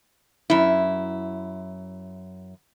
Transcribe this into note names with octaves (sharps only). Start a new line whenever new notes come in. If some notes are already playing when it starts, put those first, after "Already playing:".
F#2 E4